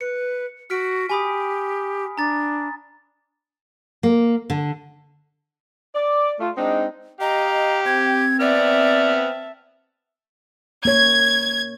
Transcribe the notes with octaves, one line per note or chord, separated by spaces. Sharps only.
B4 C#7
F#4 F6 B6 D7
G4 G#5 B5 D#6
D4 A#5 A6
A#3
D3
D5
A3 F4
G#3 C4 D4 D#4
G4 D#5 F5 A#5
C4 G#6
B3 D5 E5 A5 F6
A#3 C#5 G#6